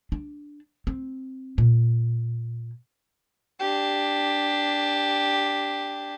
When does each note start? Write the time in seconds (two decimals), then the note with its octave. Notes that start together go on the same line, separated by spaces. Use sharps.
0.12 D4
0.87 C4
1.58 A#2
3.60 D4 G4